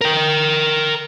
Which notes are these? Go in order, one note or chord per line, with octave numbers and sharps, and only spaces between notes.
A#4 G5